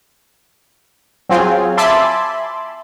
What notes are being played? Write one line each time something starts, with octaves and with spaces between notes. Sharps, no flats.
F#3 C4 F4 G#4
E5 G#5 A5 B5 C6 D6